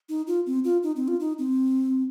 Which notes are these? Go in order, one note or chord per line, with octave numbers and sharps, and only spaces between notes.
D#4
F4
C4
F4
D#4
C4
F4
D#4
C4